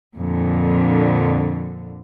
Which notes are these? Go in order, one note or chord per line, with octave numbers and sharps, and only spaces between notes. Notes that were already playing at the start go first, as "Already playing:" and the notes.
F2 A#2 D3